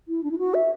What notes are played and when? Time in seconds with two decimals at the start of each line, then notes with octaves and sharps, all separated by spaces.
0.08 E4
0.23 D4
0.31 E4
0.39 F#4
0.54 E5